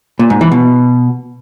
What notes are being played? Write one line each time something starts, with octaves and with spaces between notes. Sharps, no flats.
A#2
G#2
E3
B2